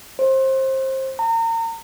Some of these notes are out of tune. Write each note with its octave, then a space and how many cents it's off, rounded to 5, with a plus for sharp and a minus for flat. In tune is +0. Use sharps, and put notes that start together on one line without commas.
C5 +25
A#5 -35